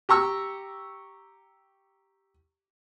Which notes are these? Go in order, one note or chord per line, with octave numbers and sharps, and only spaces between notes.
G4 A#5 C#6 E6